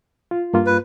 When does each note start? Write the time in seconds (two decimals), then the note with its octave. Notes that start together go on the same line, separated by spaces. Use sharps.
0.31 F4
0.54 G2 A#3 F4
0.66 B4